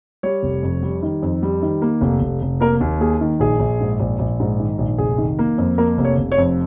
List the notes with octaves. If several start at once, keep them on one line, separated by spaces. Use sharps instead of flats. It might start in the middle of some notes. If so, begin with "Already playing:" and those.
G3 C#5
F1
F2
G3
D#3
F2
G3
D#3
A#3
F1
F1
F1
A#3 A#4
D#2
A#3 G#4
D#3
A#1 G#4
A#1
G#2
A#1
A#1
G#2
D#3
A#1
F1 G#4
D#3
A#3
F2
A#3 A#4
F1
C#5
F1
C#5
F2